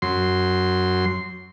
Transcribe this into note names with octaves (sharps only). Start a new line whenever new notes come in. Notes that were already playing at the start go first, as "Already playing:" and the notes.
F#2 C6